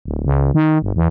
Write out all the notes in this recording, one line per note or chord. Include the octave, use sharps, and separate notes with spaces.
D1
C#2
D#3
G1
E2